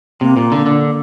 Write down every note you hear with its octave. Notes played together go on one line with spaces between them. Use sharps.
C3 A#3
A#2
D3
D3